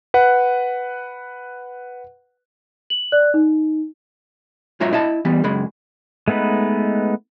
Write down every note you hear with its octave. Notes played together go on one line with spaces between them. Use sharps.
B4 F#5
F#7
D5 F#6
D#4
G#2 F#3 F4 C#5 E5 A#5
E4 D#5 E5 A5
E3 G3 B3
F#2 C#3 G#3 B5
G#3 A3 B3 D#4 B4